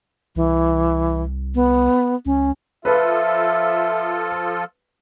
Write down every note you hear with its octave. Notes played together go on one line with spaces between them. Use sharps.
C2 E3
B3
C#2 C#4
F3 F4 A4 B4 E5 B5